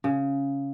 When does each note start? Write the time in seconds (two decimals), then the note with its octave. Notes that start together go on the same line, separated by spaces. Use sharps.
0.04 C#3